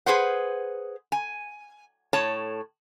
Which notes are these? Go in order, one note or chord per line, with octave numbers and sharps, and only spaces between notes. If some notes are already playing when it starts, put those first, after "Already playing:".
G#4 B4 C5 F#5
G#5
A2 C#5 A5